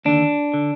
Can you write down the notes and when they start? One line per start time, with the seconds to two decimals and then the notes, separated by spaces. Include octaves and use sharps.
0.05 D#2 D3 D4
0.54 D3